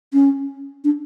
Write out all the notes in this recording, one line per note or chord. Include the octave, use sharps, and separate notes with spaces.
C#4
D4